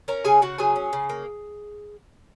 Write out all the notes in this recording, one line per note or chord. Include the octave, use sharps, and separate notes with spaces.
C#4 A#4 A#5
C#3 G#4 G#5
C#3 F#4 F#5
F#3 G#4 G#5
C#4
C#3
A#3